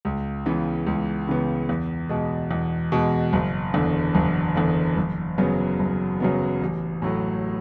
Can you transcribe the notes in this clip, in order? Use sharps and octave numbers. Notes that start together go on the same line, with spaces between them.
C#2
C#3 E3 B3
C#2
C#3 E3 B3
E2
B2 G#3
E2
B2 G#3
F#1
E2 D3
F#1
E2 D3
F#1
F#2 C#3 F#3 B3
F#1
F#2 C#3 F#3 B3
A1
A2 F#3 A3